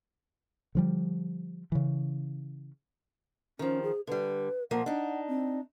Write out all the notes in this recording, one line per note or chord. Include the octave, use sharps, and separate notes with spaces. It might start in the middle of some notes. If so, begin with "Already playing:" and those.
D3 F3 G3
C#3 E3
D#3 F3 C#4
G#4
D3 G3 B4
A#2 F3 A#3 F#5
D4 D#4
C4